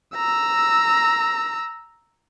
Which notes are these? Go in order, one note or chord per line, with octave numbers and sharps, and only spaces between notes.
A#5 E6